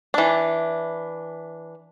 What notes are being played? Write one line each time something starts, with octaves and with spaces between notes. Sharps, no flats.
E3 D4